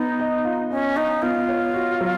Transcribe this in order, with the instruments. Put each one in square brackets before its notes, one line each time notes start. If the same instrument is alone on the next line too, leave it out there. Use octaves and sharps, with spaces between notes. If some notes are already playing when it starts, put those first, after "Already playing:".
Already playing: [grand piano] B3 [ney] D#4
[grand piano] D#5
F4
[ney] C#4 [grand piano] D#5
[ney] D#4 [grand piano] D#5
[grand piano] B3 [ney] F4
[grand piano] C#5
F#4
F#3